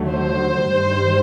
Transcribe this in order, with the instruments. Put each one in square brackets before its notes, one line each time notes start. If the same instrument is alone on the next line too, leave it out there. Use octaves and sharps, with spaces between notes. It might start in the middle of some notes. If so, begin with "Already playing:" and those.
Already playing: [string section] D#2 D3 F#3 A3
C5
G2 D#3 G3